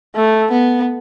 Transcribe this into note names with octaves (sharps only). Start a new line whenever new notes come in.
A3
B3